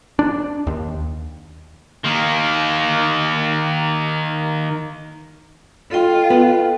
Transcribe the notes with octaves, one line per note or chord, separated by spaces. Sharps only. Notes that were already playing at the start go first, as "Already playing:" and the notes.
D4
D#2
D#3 A#3
F4 A4 D#5 G5
B3